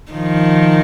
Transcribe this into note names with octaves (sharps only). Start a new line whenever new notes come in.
D#3 F3